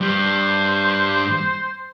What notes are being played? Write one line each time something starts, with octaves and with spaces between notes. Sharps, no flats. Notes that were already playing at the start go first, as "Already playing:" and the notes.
G2 G3 C5